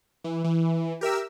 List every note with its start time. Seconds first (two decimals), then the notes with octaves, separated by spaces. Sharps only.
0.24 E3
0.44 E3
1.01 G4 A#4 E5 E6